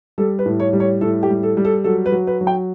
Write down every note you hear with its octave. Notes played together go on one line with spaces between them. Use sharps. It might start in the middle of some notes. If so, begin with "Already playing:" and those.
G3 A4
B4
A2
C#5
G3
C#5
A2 A4
G4
G3
A4
G3
A4
F#3 A4
B4
F#3
B4
F#3
G5